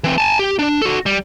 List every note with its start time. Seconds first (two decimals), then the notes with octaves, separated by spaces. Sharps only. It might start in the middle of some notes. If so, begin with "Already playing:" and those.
0.04 E3 C4
0.18 G#5 A5
0.39 G4
0.59 D4
0.82 F#4 A4
1.06 G3